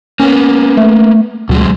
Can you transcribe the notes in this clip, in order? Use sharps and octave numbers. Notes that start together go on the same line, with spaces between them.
A#3 B3 C#4
A3
D2 B2 F#3 G#3